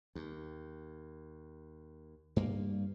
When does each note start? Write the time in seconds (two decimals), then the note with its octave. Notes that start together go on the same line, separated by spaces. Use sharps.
0.15 D#2
2.36 G2 A#3